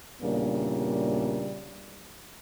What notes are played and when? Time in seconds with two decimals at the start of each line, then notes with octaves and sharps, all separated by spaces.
0.22 E2 A#2 C#3 G3 A#3 D4